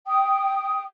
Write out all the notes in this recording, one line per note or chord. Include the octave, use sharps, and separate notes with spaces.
G5 D#6